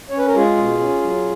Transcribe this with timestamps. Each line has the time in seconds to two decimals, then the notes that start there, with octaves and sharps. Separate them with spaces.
0.10 C#4 C#5
0.18 B4
0.27 A#4
0.35 G#3 F4 G#4
0.57 B2
0.79 C#4
1.02 F#3